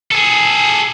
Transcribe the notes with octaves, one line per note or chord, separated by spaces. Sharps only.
G#4 A4